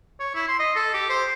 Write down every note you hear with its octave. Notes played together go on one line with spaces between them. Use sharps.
C#5
E4
C6
D#5
A4
G4
C5